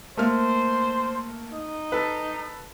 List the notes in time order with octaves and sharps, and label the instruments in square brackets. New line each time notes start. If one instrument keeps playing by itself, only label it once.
[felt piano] A3 A#3 F6 [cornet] C5
[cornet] D#4
[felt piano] A4 B4